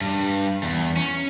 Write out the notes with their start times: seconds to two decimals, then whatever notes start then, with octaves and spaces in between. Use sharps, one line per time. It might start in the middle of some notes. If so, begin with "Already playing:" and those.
0.01 G2
0.63 E2
0.97 C#4